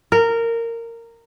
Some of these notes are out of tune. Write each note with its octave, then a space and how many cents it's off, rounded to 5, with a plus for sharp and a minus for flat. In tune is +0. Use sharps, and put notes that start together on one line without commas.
A#4 -15